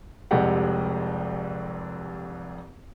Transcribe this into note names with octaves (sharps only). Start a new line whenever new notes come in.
F1 C2 F2 G#3 G4 F#5